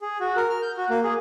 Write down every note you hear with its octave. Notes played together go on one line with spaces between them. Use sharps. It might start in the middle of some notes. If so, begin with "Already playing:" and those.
G#4
F#4
A#4
F6
G6
F#4
A#3
G#4